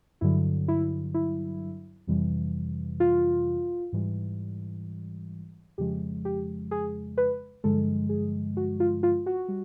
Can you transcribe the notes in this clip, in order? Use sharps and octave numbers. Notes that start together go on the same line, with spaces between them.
G2 D3 F#3 E4
E4
E4
F2 C3 E3 G3
F4
G#2 E3 G3
F2 C#3 F3 G#3 G4
G4
G#4
B4
G2 D3 F3 G#3 A4
G#4
F#4
F4
F4
F#4
G3